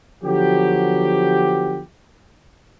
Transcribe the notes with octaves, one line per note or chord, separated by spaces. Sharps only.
D3 F3 F#3 B3 G4